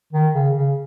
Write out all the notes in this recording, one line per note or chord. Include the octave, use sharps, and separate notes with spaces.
D#3
C#3
C#3